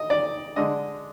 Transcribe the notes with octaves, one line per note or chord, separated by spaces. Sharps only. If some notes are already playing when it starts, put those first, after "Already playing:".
Already playing: D#5
D5
D3 G#3 D4 D#5